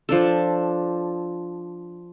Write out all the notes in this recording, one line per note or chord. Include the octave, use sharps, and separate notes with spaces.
F3 D4 A4